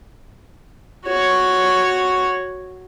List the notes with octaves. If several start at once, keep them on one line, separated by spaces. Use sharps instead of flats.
F#4 C#5